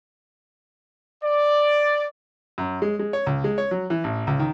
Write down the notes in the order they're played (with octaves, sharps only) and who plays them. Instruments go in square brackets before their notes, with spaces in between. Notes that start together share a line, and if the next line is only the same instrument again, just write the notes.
[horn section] D5
[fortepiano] F#2
G#3
G#3
C#5
C#2
G#3
C#5
F#3
E3
A1
C#2
D#3